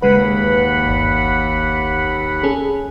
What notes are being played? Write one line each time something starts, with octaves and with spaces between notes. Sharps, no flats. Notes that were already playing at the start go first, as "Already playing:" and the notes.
D#2 C#3 G#3 B4 F#5 B5
G1
C#4 G#4 A4